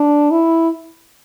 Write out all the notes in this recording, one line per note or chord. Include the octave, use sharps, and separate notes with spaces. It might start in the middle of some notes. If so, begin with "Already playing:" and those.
Already playing: D4
E4